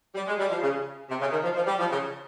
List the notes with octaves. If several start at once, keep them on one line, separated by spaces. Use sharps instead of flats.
G3
G#3
G3
F3
C#3
C3
C#3
D#3
F3
F3
G3
F3
C#3